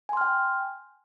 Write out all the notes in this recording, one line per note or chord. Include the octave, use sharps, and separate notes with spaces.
G5 G#5 C6 F6